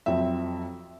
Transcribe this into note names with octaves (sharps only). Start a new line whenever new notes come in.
F2 F#3 C4 E5